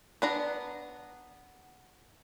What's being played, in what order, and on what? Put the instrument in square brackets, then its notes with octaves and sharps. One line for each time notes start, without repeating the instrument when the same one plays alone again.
[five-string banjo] B3 D4 A#5